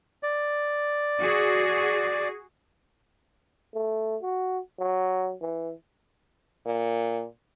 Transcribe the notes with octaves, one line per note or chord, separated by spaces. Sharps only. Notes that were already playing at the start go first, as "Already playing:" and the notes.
D5
F#4 G#4
A3
F#4
F#3
E3
A#2